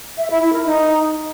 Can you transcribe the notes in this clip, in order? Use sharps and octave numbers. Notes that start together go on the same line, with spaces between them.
E5
E4
E4
A#4
D#4